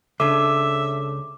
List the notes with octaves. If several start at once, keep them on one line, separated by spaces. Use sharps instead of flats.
C#2 C#3 D4 A4 E5 D6